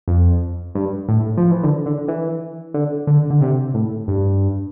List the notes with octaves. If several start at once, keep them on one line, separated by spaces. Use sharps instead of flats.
F2
G2
A2
F3
E3
D3
D3
E3
D3
D3
D3
C3
A2
G2